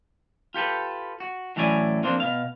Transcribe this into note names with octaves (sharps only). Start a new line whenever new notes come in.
F4 G4 A4 B4
F#4
A2 E3 F#3 C#4 D5 G#5
F3 A#3 C4 D4
B2 F5